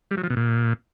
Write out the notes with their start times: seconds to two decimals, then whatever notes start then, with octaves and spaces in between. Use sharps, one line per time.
0.11 G3
0.17 F#3
0.24 F3
0.30 B2
0.36 A#2